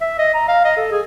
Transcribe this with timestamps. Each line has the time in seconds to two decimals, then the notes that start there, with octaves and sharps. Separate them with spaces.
0.01 E5
0.19 D#5
0.34 A#5
0.48 F5
0.65 D#5
0.77 A4
0.91 G#4